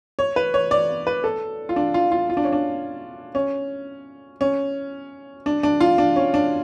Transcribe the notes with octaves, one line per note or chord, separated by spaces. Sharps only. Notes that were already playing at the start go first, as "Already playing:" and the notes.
C#5
B4
C#5
D5
B4
A4
F4
D4
F4
F4
F4
D4
C#4
D4
C#4
C#4
D4
D4
F4
D4
C#4
D4